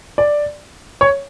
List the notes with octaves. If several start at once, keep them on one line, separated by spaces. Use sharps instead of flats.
D5
C#5